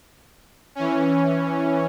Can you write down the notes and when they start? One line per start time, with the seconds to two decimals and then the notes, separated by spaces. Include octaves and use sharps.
0.75 E3 C#4